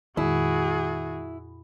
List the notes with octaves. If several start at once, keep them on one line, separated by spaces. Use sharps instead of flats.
F2 A#2 D#3 G#3 E4 F#4 G#4